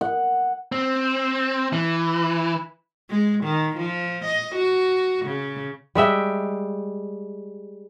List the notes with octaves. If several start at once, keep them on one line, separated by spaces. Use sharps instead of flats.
F#5
C4
E3
G#3
D#3
F3
D#5
F#4
C#3
G3 G#3 E5 G5